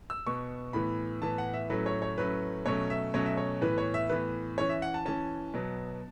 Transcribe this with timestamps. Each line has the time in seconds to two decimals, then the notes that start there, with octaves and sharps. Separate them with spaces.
0.10 E6
0.27 B2 B3 C#6
0.73 A2 E3 B3 B5
1.21 A2 E3 B3 A5
1.38 F#5
1.54 E5
1.70 A2 F#3 A3 C#4 B4
1.86 C#5
2.02 C#5
2.18 A2 F#3 A3 C#4 B4
2.66 B2 F#3 A3 C#4 C#5
2.90 E5
3.14 B2 F#3 A3 C#4 C#5
3.26 E5
3.37 C#5
3.61 A2 E3 B3 B4
3.78 C#5
3.94 E5
4.09 A2 E3 B3 B4
4.58 E3 C#4 C#5
4.69 E5
4.82 F#5
4.94 A5
5.06 E3 C#4 A5
5.54 B2 F#3 B3